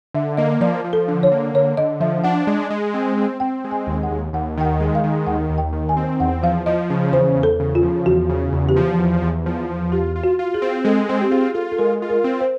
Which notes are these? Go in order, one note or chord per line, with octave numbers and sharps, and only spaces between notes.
D3 E5
A#3 D#5
F3 D5
F3
A4
D3
C#5
A#3
D3 C#5
D3 D#5
F3 E5
D4 F#5
G#3
G#3
C4
C4
C4 G5
G#3
G#5
D#2
F#5
D#2
D#2 F#5
D#3 G5
F#5
G#3
F5
D#3
D#2 F#5
D#2
G5
D#3
G#5
C4
E2 F#5
F3 F5
F3 D#5
C#3
E2 C5
E2
A4
C#3
F4
F3
E2 F#4
C#3
E2
G4
F3
E2
E2
F3
E2
F4 G4
F4
F#4
F4
G#4
C4
G#3 A4
C4 G#4
G4
F4 G#4
F4 A4
A4
G#3 A#4
F4
A#4
C4
C5